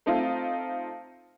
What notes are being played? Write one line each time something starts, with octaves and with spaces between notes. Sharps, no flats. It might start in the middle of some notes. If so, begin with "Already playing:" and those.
A3 C4 D#4 F4